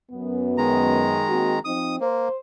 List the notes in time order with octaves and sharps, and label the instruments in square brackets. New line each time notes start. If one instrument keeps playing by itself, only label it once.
[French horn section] F#2 B3
[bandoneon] D#3 G#3 A#5
[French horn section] A#3 C4 F#4
[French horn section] F3 C4 D#4 [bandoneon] D#6
[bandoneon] A#3 [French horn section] C5